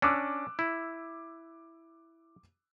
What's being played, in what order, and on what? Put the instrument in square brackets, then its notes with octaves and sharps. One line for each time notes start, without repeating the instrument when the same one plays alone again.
[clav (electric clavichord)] C#4 D4 [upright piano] D6 E6 F#6
[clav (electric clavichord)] E4